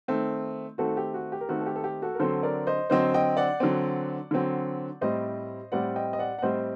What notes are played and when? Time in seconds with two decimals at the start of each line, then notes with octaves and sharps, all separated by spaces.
0.08 D#3 A3 C4
0.78 D#3 A3 C4 F#4 A4
0.97 G4
1.14 F#4
1.32 G4
1.41 A#4
1.49 D#3 A3 C4 F#4 A4
1.61 A4
1.66 G4
1.76 A4
1.84 G4
2.02 F#4 A4
2.15 A#4
2.20 D3 F#3 C4 A4 C5
2.43 A#4 D5
2.67 C5 D#5
2.90 D3 F#3 C4 C5 D#5
3.14 D#5 G5
3.37 D5 F#5
3.60 D3 F#3 C4
4.31 D3 F#3 C4
5.01 A2 G3 C4 C5 D#5
5.72 A2 G3 C4 D5 F#5
5.96 D#5 G5
6.13 D#5
6.19 D5 F#5
6.38 F#5
6.42 A2 G3 C4 C5 D#5